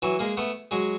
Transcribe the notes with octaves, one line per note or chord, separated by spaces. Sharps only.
E3 F#3
G#3 A#3
A3 B3
F#3 G#3